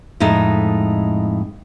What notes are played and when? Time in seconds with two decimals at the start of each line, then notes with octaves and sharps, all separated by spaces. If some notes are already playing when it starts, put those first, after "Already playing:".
0.20 F2 A2 G#3 D#4 E5